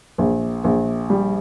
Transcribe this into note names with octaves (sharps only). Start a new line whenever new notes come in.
A#1
A#1
G3